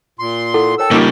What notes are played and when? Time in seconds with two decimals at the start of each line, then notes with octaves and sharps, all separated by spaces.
0.19 A#2 C6
0.54 E4 A4 F#5
0.78 A4 A#4 C#5 G5 E6
0.91 C#3 G3 A#3 D#4 F4 C#6 D6